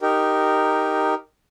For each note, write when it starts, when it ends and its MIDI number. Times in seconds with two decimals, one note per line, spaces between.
0.01 1.14 63
0.01 1.14 67
0.01 1.14 70